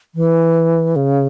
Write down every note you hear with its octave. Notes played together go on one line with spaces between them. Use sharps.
E3
C#3